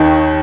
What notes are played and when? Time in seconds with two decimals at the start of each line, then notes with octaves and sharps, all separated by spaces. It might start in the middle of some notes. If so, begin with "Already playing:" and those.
Already playing: D#2 D#3